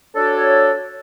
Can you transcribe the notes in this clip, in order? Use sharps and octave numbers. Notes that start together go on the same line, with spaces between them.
D4 F#4 A4 C#5